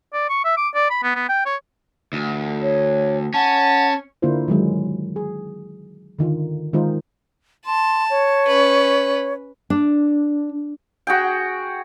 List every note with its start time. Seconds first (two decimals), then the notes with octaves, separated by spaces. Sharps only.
0.13 D5
0.29 C#6
0.44 E5
0.57 D6
0.74 D5
0.90 B5
1.03 B3
1.15 B3
1.29 G5
1.46 C#5
2.13 D2
2.61 C#5
3.34 C#4 F#5 A5
4.22 D3 A#3 D4 E4 F4 C5
4.48 D#3 F#3 G#3
5.16 G#4
6.19 D3 D#3 F4
6.73 D#3 G#3 D#4 F4 C5
7.66 A5 C6
8.10 C#5
8.47 C#4 B4
9.70 D4
11.07 F#4 G#4 G5